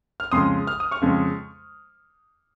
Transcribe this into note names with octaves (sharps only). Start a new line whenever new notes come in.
F6
F2 C#3 G#3 C6 D#6
F6
D#6
C#6 F6
F2 C#3 G#3